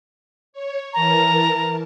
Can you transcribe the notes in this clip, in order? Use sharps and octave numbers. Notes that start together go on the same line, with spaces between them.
C#5
E3 A#4 A5 A#5